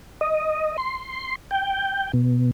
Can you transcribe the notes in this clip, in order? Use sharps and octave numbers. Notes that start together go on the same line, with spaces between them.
D#5
C6
G5
B2